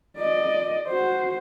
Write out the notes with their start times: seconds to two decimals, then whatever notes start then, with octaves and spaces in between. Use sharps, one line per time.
0.17 D5 D#5
0.88 F#4 C5